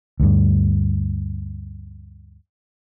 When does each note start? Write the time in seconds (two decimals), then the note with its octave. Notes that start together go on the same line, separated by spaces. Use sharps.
0.20 D2 G2